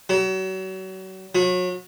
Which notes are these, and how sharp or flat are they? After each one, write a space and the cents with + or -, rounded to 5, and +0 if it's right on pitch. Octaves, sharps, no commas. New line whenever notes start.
F#3 +35
F#3 -30